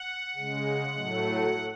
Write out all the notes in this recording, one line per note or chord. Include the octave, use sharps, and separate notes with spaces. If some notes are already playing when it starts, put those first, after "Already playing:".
Already playing: F#5
C#3 G#3
A2 F#3 A3